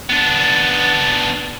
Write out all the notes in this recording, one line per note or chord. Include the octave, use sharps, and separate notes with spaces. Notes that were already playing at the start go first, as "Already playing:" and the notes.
B3 D4